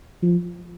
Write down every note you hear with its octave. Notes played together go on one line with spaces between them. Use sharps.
F3